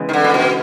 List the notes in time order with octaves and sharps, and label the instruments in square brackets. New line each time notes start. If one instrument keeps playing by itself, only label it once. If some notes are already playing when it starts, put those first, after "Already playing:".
Already playing: [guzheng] C#3 E3 G#3 B3
[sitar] D#3
D3
A#2
B2